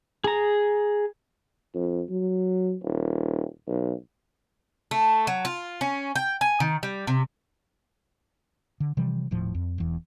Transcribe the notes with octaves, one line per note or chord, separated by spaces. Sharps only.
G#4 A#5
F2
F#3
D#1
B1
A3
F#3
F4
C#4
G5
G#5
D#3
G3
C3
D3
C3 E3 F3 G3
D#1 A2 F3
F2
E1 E2